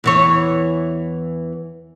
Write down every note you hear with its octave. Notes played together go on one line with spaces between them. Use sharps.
E2 E3 C#5